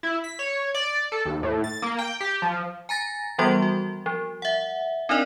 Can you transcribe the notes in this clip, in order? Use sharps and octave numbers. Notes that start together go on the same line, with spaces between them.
E4
B6
C#5
D5
A4
D#2
A2
A6
A#3
G5
G4
F3
G#5 A#5 A6 A#6
E3 F3 G3 B3 F#4 C6
F#4
F3
E5 F#5
C4 D4 D#4 A#4 D5 D#5